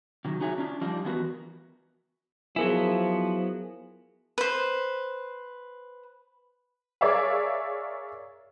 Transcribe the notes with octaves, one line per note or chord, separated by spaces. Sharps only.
C3 D#3 F#3
D#4 F#4 G#4 C#5 E5 A#5
C#4 D4 F4
F3 G3 D4 D#4 F4
E3 F#3 B3 F#4 A#4 B4
F3 F#3 B3 E4 G#4 A#4 G#5
B4 C5
G#4 A#4 C#5 D5 E5 F5